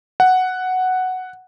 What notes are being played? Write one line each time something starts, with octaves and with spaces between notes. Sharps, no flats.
F#5